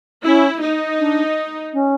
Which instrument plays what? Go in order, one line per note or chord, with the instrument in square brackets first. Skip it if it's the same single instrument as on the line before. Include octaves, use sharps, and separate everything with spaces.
[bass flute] C#4 [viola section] E4
[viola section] D#4
[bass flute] D4
C#4